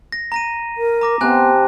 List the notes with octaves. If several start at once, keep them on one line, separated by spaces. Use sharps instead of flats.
A#6
A#5 A#6 D#7
A#4
A#5 D6 A#6
C3 B3 C5 G#5 A5 F#6